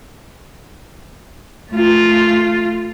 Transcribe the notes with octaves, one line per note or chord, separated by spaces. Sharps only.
A3 F4